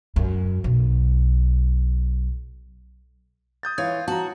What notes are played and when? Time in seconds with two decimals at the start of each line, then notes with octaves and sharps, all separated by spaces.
0.16 F#2
0.64 B1
3.63 D#6 G6 A6
3.78 E3 F4 C#5 G#6
4.08 F#4 A5 A#5